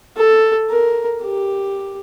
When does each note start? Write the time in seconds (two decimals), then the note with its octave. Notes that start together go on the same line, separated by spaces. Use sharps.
0.17 A4
0.69 A#4
1.23 G4